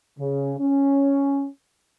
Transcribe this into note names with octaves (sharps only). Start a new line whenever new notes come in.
C#3
C#4